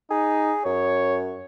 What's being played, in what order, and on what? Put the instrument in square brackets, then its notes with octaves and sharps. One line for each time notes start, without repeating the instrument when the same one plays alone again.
[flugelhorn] D#4 [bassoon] G#4
[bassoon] F#2 [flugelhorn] C#5